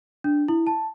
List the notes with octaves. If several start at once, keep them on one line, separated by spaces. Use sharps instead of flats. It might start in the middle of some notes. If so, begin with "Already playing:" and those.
D4
E4
A5